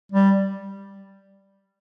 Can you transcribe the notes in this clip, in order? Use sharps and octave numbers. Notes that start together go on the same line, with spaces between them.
G3